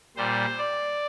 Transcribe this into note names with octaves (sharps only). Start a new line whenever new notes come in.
A#2 G3 C5
D5